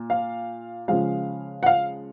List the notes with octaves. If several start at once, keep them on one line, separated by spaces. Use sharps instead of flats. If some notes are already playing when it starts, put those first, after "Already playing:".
Already playing: A#2
F5
C#3 F3 G#3 F5
F#5
F5